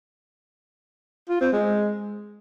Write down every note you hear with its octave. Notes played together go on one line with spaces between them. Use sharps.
F4
C4
G#3